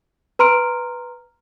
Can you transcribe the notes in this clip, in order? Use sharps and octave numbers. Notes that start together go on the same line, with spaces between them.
B4 A#5 C6 F6 D7